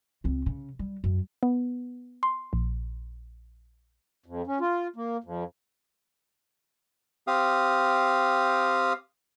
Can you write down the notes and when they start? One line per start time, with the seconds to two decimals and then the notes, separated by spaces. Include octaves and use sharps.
0.24 C#2 C4
0.46 C#3
0.79 G3
1.04 F#2
1.43 B3
2.23 C6
2.53 A#1
4.26 F2
4.47 C#4
4.60 F4
4.96 A#3
5.24 F2
7.27 C4 G4 F5 D#6